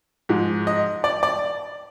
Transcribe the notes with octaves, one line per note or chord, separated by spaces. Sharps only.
G#2 F3 G#3
D#5
D5
D5